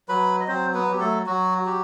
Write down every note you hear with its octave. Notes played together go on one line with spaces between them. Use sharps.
F#3 B4 B5
D#5
F#3 C4 C5
B3 B4
F#3 G4
A3 A4
F#3 F#4
F#4 G4